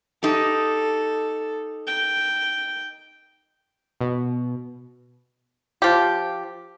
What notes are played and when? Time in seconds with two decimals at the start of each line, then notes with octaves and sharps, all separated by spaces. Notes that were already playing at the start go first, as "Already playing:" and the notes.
0.23 D#4 G4 A4
1.87 G5
4.01 B2
5.82 F3 G4